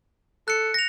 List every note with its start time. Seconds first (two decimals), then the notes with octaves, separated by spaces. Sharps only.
0.48 A4 F#6 C#7
0.74 A#6 F7